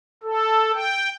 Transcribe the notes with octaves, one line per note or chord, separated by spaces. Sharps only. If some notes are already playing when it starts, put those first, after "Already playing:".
A4
G5